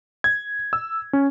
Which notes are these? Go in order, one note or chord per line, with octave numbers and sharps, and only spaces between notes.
G#6
E6
C#4